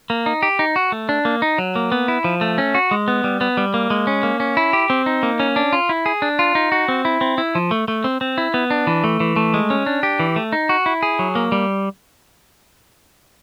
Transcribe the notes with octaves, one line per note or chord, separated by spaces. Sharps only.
A#3
D#4
G4
D#4
F#4
A3
D4
A#3
D#4
F#3
A#3
B3
E4
F3
A3
C#4
F#4
G#3
B3
G3
B3
G3
A#3
G#3
C#4
A#3
C#4
E4
G4
C4
D#4
A#3
C#4
D4
F4
E4
G#4
D4
F4
D#4
F#4
C4
E4
C4
E4
F3
A3
A3
C4
C4
E4
B3
D4
E3
A3
E3
A3
G#3
C#4
D4
G4
E3
A3
D#4
F#4
E4
G#4
F#3
A#3
G3